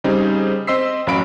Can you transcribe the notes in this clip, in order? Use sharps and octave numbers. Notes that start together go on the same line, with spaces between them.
C#3 G3 C4 D#4 G#4
C4 D#5 C6 E6 B6 C7
A1 F#2 F#3 F5 B5 D7